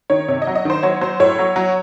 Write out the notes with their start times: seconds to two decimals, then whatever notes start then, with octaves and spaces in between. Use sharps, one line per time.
0.10 D#3 C#5
0.28 C3 C#5
0.42 D#5
0.47 F#3
0.55 D#5
0.65 D#3 C5
0.83 F#3 C#5
1.01 F#3 C5
1.20 A2 C#5
1.39 F#3
1.56 F#3